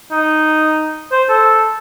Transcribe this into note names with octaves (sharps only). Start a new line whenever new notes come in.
D#4
C5
A4